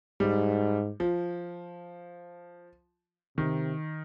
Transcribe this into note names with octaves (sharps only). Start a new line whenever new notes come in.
G#2 G3
F3
C3 D#3